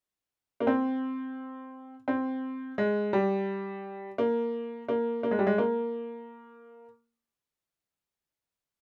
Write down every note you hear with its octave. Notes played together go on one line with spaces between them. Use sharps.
A#3
C4
C4
G#3
G3
A#3
A#3
A#3
G#3
G3
G#3
A#3